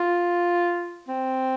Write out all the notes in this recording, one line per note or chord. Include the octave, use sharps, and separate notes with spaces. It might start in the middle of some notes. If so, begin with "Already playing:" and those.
Already playing: F4
C4